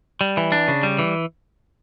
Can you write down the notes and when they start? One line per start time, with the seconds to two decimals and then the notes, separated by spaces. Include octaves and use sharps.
0.21 G3
0.37 E3
0.52 D4
0.68 C#3
0.83 G3
0.99 E3